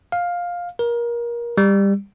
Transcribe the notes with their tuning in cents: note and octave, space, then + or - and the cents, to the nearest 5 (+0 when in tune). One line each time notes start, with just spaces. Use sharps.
F5 +10
A#4 +25
G3 +20